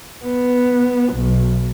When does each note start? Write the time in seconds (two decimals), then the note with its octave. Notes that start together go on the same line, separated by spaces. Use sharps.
0.24 B3
1.14 B1